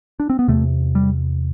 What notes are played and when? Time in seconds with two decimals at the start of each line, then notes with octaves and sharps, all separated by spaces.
0.20 D4
0.30 C4
0.39 B3
0.48 E2 C3 A3
0.95 G3